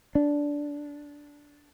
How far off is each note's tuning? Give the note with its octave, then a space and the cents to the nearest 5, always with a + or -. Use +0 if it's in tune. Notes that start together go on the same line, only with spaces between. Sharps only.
D4 -10